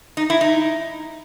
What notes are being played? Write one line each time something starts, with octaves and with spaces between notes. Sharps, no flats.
D#4
E4
D#4